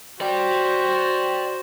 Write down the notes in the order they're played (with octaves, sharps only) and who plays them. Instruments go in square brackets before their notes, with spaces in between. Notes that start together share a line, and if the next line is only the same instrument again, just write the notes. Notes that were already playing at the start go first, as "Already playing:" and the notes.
[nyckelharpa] F#4 C5 [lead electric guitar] D5 G5